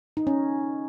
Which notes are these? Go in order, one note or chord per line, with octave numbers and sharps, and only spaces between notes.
D#4
C#4